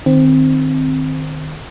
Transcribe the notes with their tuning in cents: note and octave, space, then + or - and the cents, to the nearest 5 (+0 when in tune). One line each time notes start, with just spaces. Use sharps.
D#3 -25 C4 +0